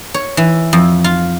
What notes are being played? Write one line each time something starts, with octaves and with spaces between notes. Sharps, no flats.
C#5
E3
F2
F4